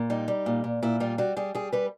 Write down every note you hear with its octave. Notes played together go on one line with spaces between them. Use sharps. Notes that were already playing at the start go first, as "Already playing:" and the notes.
Already playing: A#2
G3 D#4
G3
A#2
A#2
A#2 E4
G3 F4
G3 F#4
G3 G#4
G3 G#4
G3 B4